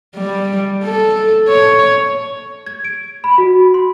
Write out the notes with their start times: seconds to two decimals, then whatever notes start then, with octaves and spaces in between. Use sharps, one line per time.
0.16 G3
0.84 A4
1.48 C#5
2.66 G#6
2.84 D7
3.24 B5
3.38 F#4
3.74 C6